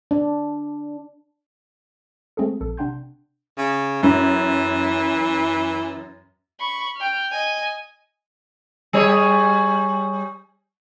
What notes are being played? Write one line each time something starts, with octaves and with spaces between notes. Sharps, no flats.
D4
G#3 A3 C4 G#4 A4
A#1 A4
C3 D4 F#5 G5 C6 G6
C#3
F#2 E3
B5 C#6
G5 F6
D#5 G#5
G3 G#4 C#5